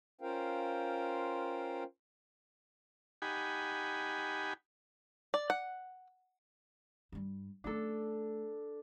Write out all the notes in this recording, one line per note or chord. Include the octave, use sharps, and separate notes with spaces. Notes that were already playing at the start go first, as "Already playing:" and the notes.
C#4 F4 A#4 C5 F5 G5
D#4 G4 F#5 G#5 B5
D5
F#5
G2 G3
A3 C#4 D4 A4